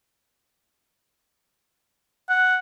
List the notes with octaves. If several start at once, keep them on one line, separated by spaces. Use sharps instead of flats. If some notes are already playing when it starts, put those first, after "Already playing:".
F#5